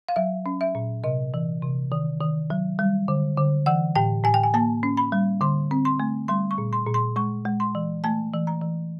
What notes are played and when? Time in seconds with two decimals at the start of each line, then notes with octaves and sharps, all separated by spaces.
0.09 F5
0.16 F#3 E5
0.46 C#4
0.61 E5
0.75 A#2
1.04 C3 D#5
1.34 E3
1.62 C3
1.92 D#3
2.21 D#3
2.50 F#3
2.79 G3
3.08 D3
3.37 D3
3.66 E3 F#5
3.96 A2 G5
4.24 A2 G#5
4.34 G5
4.43 G#5
4.54 A#3 A5
4.83 C#4
4.97 B5
5.12 G3
5.41 D3 C6
5.71 C4
5.85 C6
6.00 A3
6.28 G3 C6
6.51 C#6
6.58 A#2
6.73 C6
6.87 A#2
6.94 C6
7.16 G#3 C#6
7.45 G#3
7.60 C6
7.75 E3
8.04 A3 A5
8.34 E3
8.47 A#5
8.62 E3